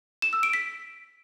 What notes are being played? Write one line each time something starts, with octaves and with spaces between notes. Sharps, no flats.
E7
E6
D7
B6